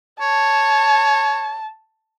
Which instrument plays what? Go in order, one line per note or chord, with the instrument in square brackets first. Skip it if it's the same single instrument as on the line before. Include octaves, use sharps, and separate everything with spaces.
[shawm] C#5 [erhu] A5